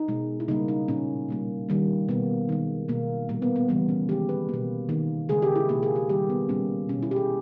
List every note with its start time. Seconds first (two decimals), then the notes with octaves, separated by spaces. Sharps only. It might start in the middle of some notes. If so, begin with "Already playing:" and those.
Already playing: D#4
0.08 B2 G#3
0.40 E4
0.48 C#3 G3 A#3 D#4
0.68 D#4
0.88 A#2 A#3 C#4
1.28 B2 G3 A#3
1.69 D#3 G3 A#3
2.09 B2 A#3 B3
2.49 D#3 G#3
2.88 B2 A#3
3.29 A#2 G3 A#3
3.42 B3
3.56 B3
3.69 C#3 E3 G3 A#3 B3
3.89 C#4
4.09 D#3 G#3 G4
4.29 B4
4.49 B2 A#3
4.89 D#3 A#3
5.29 C#3 G#3 G#4
5.42 G4
5.56 E4
5.69 B2 A#3 G4
5.83 G#4
5.96 G4
6.09 D#3 G3 A#3 G4
6.30 B3
6.49 A#2 G3 A#3 C#4
6.89 B2 G#3 C#4
7.03 E4
7.11 G4
7.16 G#4